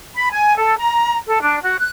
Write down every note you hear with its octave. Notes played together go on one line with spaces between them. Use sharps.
B5
G#5
A4
A#5
A4
D4
F#4
F#6